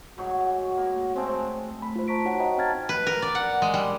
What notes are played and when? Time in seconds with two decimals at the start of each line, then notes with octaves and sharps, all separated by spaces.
0.18 G#2 F#3 F#4 C#5
0.77 A#3
1.16 G#3 A3 C4
1.82 A3 B5
1.96 F4 C5
2.08 A5 A#5 C#6 B6 D7
2.25 D#4 F#4 C#5 F#5 G5
2.40 C5 D#5 G5 A#5 B5
2.57 C4 F5 A5 F6 G#6 A6
2.89 B4
3.07 A#4
3.22 D5
3.35 F#5
3.62 G#3
3.74 G3